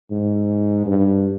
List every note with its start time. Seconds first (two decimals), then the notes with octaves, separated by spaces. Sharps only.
0.11 G#2
0.86 G2